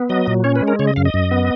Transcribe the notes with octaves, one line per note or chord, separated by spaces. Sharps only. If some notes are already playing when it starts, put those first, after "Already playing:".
Already playing: B3
F#3 D#5
A#2
C#4 C#5
B4
G#3
A#4
C#3 C#5
D#5
F#2 F5
D#5
F#2
B3